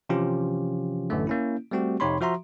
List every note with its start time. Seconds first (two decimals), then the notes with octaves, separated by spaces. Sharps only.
0.09 C3 E3 F3 C#4 F4 G4
1.10 A1 F#2 D3 A3
1.27 A#3 C#4 E4
1.71 G3 A3 C4 F#4 G4
2.00 F2 C3 D#4 C#5 B5 C6
2.21 F3 F#4 E5 A#5 C6